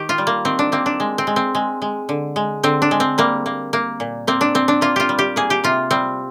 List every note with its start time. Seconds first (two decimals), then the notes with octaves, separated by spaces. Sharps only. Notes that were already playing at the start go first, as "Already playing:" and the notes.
Already playing: D#3 G4
0.09 F4
0.18 G3
0.27 A#3
0.45 D#3 C4
0.59 D4
0.72 A#3 C4
0.86 D4
1.00 G#3
1.18 C4
1.27 G#3
1.36 C4
1.55 G#3
1.82 G#3
2.09 D3
2.36 G#3
2.63 D3 C4
2.82 D4
2.91 G#3
3.00 C4
3.18 G3 A#3
3.46 A#3
3.73 A#3
4.00 A#2
4.27 A#3 C4
4.41 D4
4.55 A#2 C4
4.68 D4
4.81 A#3 F4
4.96 F4 G4
5.09 G3
5.19 G4
5.36 A#3 G#4
5.50 G4
5.64 C3 F4
5.91 G3 C4